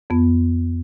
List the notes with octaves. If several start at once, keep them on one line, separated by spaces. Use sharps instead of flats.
F2 B3